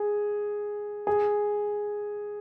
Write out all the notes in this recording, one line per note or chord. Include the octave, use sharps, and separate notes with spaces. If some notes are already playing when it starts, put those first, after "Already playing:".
Already playing: G#4
G#4